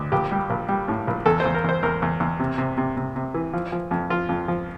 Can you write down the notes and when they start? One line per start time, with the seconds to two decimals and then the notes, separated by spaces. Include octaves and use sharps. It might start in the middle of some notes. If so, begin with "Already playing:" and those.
Already playing: D2
0.12 A#1 G4
0.32 G3
0.50 A#1
0.69 G3
0.88 A2
1.07 A#1
1.26 E2 A4
1.40 C5
1.45 E2
1.54 A#4
1.64 E2 C5
1.83 E2 A#4
2.02 E2
2.20 E2
2.40 C3
2.58 C3
2.78 C3
2.97 C3
3.16 C3
3.34 E3
3.53 F3
3.72 F3
3.91 F2
4.10 F3 F4
4.29 F2
4.48 F3